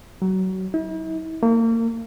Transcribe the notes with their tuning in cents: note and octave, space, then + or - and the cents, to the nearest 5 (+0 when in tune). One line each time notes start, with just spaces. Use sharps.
F#3 +25
E4 -45
A#3 -35